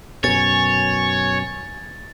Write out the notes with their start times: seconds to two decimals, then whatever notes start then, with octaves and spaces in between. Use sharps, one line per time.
0.24 F#2 B2 C#5 G#5 A6